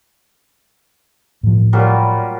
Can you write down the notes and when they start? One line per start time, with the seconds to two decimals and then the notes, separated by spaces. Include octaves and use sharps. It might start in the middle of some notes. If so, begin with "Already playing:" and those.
1.43 A2 F3
1.73 A#2 F#3 G3